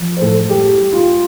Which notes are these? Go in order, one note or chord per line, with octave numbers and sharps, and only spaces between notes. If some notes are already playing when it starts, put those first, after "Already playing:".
Already playing: F3
C5
A2 A4
G3 G4
G3
F4